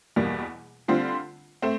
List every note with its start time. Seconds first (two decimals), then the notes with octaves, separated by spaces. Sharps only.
0.16 E2 B2 G3 A#3
0.88 D3 G3 C4 F4
1.62 A3 C4